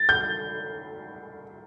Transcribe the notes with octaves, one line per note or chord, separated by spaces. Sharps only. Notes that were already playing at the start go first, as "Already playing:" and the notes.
Already playing: A6
G6